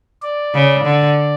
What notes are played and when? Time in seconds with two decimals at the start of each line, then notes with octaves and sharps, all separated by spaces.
0.22 D5
0.54 C#3
0.84 D3